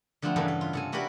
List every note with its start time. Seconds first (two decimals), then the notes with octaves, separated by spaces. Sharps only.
0.22 D3 F3 A3 B3 C4
0.36 E2 G2 C#3 A#3 A4 B4
0.48 A4
0.61 F4
0.73 C3 A4 G#5
0.92 E4 F#4 G4 A#4 B4 D5